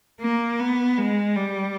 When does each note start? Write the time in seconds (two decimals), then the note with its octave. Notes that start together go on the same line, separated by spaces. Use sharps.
0.21 A#3
0.59 B3
0.98 G#3
1.35 G3